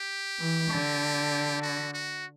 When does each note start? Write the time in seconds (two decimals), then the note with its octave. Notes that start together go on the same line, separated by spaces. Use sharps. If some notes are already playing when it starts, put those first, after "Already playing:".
Already playing: G4
0.39 E3
0.70 D3
1.62 F#4
1.93 F#4